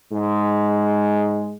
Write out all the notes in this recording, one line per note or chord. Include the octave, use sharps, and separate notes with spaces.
G#2 G#3